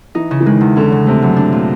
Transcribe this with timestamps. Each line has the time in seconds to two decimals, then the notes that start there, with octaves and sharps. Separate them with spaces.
0.15 E3 D#4
0.31 C#3
0.41 E3
0.46 D#3 G#3
0.61 E2
0.76 D3 C#4
0.92 C#3
1.06 C3 A3
1.22 F#2
1.37 D4
1.53 A#2